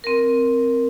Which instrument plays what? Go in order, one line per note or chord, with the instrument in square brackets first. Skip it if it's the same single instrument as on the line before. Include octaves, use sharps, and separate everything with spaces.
[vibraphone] C4 A#4